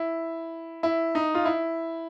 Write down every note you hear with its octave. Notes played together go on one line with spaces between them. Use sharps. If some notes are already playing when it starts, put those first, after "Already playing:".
Already playing: E4
E4
D#4
F4
E4